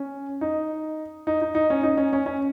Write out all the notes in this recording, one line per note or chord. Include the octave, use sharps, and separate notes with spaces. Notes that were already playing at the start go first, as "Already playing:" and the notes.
Already playing: C#4
D#4
D#4
D#4
D#4
C#4
D#4
C#4
C#4
C#4